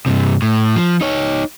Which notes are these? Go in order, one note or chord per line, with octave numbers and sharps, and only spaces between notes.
G2 C3
A2
F3
D#4 C#5